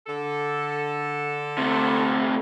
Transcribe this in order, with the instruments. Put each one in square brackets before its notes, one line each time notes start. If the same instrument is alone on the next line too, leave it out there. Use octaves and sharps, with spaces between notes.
[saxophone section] D3 A4
[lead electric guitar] C3 A3